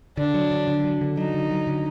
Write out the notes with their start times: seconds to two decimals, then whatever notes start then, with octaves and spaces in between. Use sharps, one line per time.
0.17 D3 D4
0.34 F#3
0.51 D3
0.67 D3
0.84 F#3
1.01 D3
1.17 F#3 D#4
1.34 D3
1.51 F#3
1.67 D3